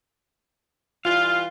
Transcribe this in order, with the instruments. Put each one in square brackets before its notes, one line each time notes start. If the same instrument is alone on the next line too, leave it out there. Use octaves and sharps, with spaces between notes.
[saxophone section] E3 G3 F4 [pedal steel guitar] F5